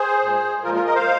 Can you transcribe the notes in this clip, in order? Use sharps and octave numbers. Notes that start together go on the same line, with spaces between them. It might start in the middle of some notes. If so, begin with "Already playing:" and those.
Already playing: G#4 C5
A#2 G#3
A#2 F3 G#3 F4 A#4
F4 A#4
A#4 D#5
C5 F5